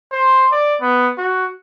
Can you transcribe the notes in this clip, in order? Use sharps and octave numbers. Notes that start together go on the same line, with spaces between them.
C5
D5
B3
F#4